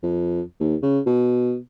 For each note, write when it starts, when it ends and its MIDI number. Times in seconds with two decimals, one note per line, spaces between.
0.03 0.41 41
0.60 0.75 39
0.83 0.99 49
1.06 1.57 47